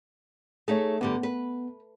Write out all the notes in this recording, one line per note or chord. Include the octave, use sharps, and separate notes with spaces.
A3 D#4 G#4 C#5 E5
G2 D3 G3 B3
B4